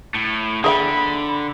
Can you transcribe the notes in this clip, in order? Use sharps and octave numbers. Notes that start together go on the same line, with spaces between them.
A2 A3
D3 G#4 E5 G5 B5